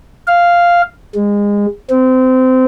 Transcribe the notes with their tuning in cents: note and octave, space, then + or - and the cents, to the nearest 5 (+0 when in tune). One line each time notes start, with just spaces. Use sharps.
F5 -5
G#3 -25
C4 -25